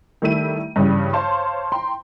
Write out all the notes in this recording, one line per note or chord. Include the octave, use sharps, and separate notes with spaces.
D#3 G3 A3 E4 E5 D#7
G2 C#3 E3 G3
C5 C#5 F5 A5 C6
G5 A#5 C6